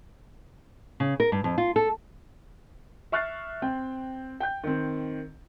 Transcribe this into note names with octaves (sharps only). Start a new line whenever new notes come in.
C#3
A#4
G2
F2
F4
A4
E5 C#6 F6 F#6 A6 C7
C4 G5
G5 G6
D#3 C4